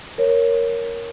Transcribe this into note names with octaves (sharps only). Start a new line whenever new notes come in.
A#4 C#5